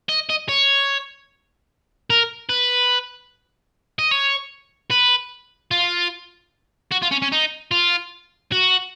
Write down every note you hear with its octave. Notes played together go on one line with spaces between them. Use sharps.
D#5
D#5
C#5
A#4
B4
D#5
C#5
B4
F4
F#4
F4
C#4
C#4
D#4
F4
F#4